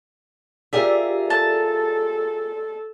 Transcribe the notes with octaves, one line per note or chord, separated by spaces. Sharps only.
F4 G4 G#4 A#4 D5 E5
A4 A5